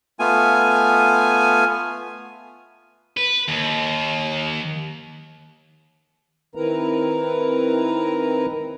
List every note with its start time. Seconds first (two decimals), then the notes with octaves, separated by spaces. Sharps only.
0.20 A3 B3 F4 G#5
3.17 B4
3.48 D#2
6.55 D#3 C4 E4 A#4 B4 A#5